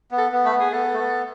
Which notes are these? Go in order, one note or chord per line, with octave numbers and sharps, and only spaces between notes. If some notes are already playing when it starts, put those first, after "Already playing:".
B3
A4
B3
A3 B4
B3
G#4
B3 A4
A3
B3